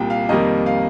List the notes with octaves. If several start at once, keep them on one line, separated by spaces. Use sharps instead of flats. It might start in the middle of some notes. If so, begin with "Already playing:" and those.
Already playing: C2 A#2 G3 G5
F5
F2 D#3 G3 A#3 D#5
F5